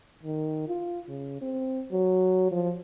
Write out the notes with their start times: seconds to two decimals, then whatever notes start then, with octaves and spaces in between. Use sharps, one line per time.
0.23 D#3
0.68 F4
1.09 C#3
1.41 C4
1.92 F#3
2.51 F3